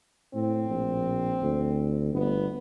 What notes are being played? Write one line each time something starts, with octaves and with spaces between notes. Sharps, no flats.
A2 C4
A#1
D2
G1 B3